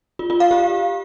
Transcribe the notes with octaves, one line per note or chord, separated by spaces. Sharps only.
F4
F4
F5
G4